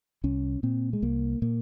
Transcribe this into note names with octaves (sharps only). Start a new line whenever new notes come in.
C2 C#4
A#2 C4
G#3
C2 A#3
A#2 A#3